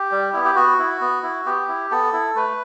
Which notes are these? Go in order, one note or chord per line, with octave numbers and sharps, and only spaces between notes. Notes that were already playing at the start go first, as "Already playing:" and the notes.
Already playing: G4
G3
B3 E4
G4
B3 F#4
E4
B3
E4
B3 G4
E4
B3 A4
E4
A3 B4